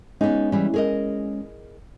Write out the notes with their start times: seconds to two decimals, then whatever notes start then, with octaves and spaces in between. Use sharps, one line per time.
0.21 G#3 B3 C#4 D#4
0.52 E3 G3
0.74 G#4 A#4 D#5